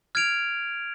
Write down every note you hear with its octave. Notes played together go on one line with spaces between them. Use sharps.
F6 G#6 D7 F7